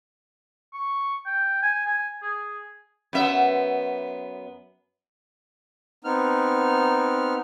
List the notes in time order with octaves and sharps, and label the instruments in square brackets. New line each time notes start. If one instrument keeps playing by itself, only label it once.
[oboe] C#6
G5
G#5
G#5
G#4
[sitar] F#2 B3 E5
[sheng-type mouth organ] B3 C4 D#4 F6